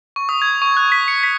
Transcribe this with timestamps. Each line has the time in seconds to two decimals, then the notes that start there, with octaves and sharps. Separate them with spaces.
0.16 C#6
0.29 D#6
0.42 G#6
0.62 C#6
0.77 F#6
0.92 B6
1.08 C#7
1.23 B6